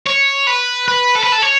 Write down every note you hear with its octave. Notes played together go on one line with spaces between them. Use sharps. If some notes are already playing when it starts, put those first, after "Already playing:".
C#5
B4
B4
A4
B4
A4
C#5